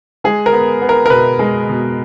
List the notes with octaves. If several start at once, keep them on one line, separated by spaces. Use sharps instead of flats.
G#3 G#4
A#4
B3
B3
A#4
A#4
B2 B4
G#3
B2